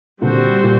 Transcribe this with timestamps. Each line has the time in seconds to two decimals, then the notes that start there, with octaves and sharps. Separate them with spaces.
0.21 A#2 D3 G3 C4 F#4 C5
0.64 A#2